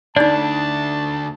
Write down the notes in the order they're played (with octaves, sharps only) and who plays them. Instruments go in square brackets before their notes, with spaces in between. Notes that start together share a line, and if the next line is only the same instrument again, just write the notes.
[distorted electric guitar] D2 [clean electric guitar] D4 [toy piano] D#4 D5 [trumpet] A5